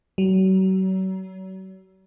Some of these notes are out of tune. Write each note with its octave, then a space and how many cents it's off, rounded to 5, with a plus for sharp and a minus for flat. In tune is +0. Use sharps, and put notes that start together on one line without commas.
F#3 +40